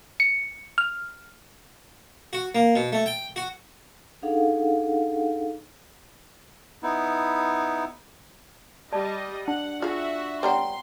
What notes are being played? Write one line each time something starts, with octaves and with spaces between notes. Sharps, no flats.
C#7
F6
F#4
A#3
B2
A3
G5
F#4
D4 D#4 G#4 A4 F5 F#5
B3 D#4 E4
G3 D5 D#5 A5
D4 F#5
F4 F#4 G#4 E5 F5
G3 B3 C#5 F#5 G5 A#5 C6